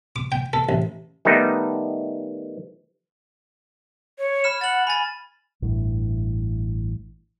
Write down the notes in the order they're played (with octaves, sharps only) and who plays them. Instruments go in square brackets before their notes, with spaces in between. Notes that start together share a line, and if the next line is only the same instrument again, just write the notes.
[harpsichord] D6
G5
A4
A1
[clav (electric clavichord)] D#3 G3 A3 B3 D#4
[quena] C#5
[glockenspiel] B5 F6 E7
[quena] F#5 [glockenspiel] A6 F#7
[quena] G#5 [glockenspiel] B5 A6
[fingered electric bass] A1 G2 E3